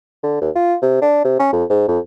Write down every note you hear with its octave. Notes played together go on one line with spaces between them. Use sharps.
D3
D#2
F4
C3
D4
C3
C#4
F2
G#2
F2